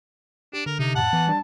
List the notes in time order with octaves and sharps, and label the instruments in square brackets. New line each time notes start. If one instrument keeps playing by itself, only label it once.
[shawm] D4 [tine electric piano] G4
[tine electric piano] D3 [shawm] A#4
[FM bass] C3 [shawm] D#4
[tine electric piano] F2 A2 [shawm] F#5 [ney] A5
[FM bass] E3 [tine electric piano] B3
[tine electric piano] G3 D4